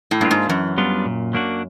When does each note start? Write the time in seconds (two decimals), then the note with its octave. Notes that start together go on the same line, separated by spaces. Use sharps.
0.11 A2
0.21 G2 A#3 D4 F4
0.31 G#2
0.49 F#2 E3
0.78 G3 B3 D4 F4
1.06 A#2
1.33 F#3 A#3 D4 F#4